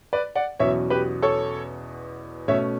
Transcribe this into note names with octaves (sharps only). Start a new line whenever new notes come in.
B4 D5
D5 F#5
E2 B2 F#3 C#4 C#5 E5
G4 B4
A4 C#5
B2 A3 C#4 C#5 E5